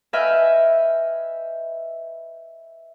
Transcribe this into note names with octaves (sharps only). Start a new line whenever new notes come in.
B4 D#5 E5 G5 G#5 F6